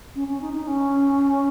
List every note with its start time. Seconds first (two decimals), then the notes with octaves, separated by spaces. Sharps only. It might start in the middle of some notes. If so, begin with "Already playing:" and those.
0.15 C#4
0.28 C#4
0.41 D#4
0.54 D#4
0.67 C#4